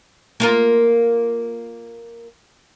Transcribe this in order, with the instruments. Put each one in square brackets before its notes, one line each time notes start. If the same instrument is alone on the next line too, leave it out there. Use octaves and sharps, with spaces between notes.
[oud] A#3 F4 A#4